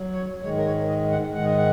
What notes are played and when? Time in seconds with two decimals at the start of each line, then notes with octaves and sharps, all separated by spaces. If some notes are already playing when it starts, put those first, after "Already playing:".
Already playing: F#3
0.13 C#5
0.43 G#2 D#3 G#3 C#5
0.58 A#4
0.66 C#5
0.88 D#5
1.11 F#5
1.33 G#2 D#3 G#3 F#5
1.45 D#5
1.57 F#5